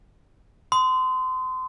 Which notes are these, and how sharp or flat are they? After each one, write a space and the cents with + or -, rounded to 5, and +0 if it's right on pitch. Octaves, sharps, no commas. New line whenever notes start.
C6 -30 D#6 +0